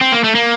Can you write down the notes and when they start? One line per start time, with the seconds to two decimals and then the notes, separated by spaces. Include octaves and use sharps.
0.01 C4
0.12 A#3
0.24 A3
0.35 A#3